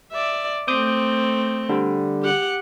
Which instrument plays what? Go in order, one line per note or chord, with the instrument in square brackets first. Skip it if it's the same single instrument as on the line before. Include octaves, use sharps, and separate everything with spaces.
[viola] D5 E5
[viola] A3 C4 [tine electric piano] D6 D#6 G6
[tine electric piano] D3 G3
[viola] G4 F#5